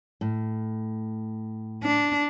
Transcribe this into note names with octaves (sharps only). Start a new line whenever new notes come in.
A2
D4